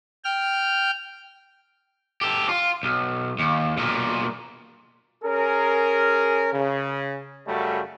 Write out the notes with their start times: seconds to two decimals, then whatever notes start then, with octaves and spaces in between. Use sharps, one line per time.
0.25 G5 F6
2.21 G4 A4
2.49 F4
2.83 B1
3.39 D#2
3.77 B1 A#2
5.23 C#4 G#4 A#4
6.53 C#3
7.47 F#2 C#3 F#3 G3 A3